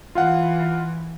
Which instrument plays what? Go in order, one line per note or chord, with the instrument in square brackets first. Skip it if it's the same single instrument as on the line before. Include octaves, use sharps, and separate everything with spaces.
[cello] E3 [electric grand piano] F4 F5 F#5